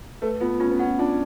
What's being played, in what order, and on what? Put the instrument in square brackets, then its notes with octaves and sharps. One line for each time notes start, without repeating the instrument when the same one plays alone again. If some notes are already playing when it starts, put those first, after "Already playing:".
[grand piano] A3 [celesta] B4
[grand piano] B3 [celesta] F4
[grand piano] C#4 [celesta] F4
[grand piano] B3
[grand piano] C#4 [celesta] F#5
[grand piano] D4 [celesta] F4